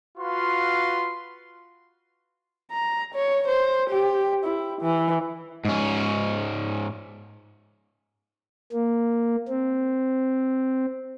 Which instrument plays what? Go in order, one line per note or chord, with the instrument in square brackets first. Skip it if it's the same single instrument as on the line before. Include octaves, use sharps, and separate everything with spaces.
[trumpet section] F4 F#4 B4 F5 C6
[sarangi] A#5
C#5
C5
G4
E4
E3
[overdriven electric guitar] G#2 C#4
[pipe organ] A#3
C4